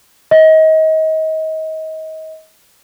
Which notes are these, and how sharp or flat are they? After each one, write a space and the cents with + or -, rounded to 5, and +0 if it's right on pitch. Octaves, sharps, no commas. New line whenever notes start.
D#5 +30